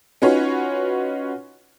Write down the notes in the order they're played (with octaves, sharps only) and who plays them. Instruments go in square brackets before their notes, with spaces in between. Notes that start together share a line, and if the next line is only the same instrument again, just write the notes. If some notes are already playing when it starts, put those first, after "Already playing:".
[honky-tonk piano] C#4 D#4 F4 F#4 B4 C#5